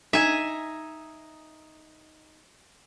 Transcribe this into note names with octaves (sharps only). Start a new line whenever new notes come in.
D#4 E5 G#5